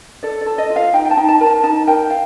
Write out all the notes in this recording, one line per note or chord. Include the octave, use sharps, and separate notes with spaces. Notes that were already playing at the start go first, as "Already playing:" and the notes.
A4 D5
D5
A4
D#5
F4
F5
D#4 G5
G5
A5
D#4
A5
A#4
A5
D#4 A5
A#4 G5
F5